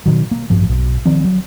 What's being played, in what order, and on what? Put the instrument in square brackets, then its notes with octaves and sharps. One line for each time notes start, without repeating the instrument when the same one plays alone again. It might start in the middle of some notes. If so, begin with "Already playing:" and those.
[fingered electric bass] B2 D#3 F#3
A#3
A1 G2 F3
B1
D#3 F3 C4
F#3